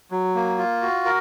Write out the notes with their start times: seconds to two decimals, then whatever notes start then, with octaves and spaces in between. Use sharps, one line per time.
0.11 F#3
0.35 A#3
0.58 F4
0.82 F#4
1.05 A#4